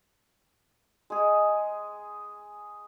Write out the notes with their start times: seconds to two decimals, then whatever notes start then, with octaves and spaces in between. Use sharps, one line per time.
1.10 G#3 G#4